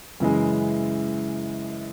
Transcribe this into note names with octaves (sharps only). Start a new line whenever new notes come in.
F#2 C#3 E3 G#3